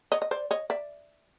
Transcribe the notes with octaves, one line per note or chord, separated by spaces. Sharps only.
C#5 D#5
D#5
C5 D5
C#5 D#5
D5 E5